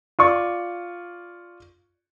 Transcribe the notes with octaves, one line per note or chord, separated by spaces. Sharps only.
F4 D5 C#6